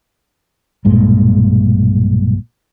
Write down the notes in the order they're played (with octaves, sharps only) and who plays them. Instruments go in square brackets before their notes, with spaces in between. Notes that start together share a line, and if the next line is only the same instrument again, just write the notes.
[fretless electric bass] B1 G2 A#2 G#3